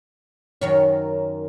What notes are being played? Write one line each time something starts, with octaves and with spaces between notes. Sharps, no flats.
F#2 D#3 C#5